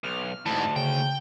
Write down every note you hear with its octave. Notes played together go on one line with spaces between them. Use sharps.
B1 F6
D2 G#2 E3 A5
C#3 G5